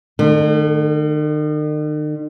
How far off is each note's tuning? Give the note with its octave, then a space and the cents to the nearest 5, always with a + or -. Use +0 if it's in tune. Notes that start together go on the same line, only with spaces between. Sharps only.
D#3 -45 A3 +0